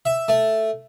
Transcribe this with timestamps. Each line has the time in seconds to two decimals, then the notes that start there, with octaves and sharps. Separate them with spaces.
0.05 E5
0.28 A3